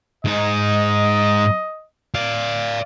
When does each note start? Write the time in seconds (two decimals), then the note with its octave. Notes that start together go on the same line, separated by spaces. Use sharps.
0.25 G#2 D#4 D#5
2.14 D5 F5